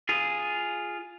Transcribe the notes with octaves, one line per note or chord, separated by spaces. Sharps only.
F4 G#4